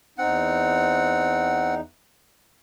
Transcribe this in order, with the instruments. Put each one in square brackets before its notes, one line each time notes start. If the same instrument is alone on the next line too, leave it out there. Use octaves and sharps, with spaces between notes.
[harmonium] E2 D#4 [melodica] C4 F#5